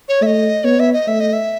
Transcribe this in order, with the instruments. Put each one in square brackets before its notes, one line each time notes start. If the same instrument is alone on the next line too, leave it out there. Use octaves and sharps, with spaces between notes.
[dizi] C#5
[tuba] A3 [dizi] E5
[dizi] D#5
[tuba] B3 [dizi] C#5
[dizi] E5
D#5
[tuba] A3 [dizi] E5
[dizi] D#5
E5